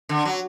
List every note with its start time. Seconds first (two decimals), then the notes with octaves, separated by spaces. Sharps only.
0.09 D3
0.25 F#3